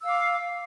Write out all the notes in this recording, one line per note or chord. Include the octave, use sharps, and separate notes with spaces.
F5 D6 E6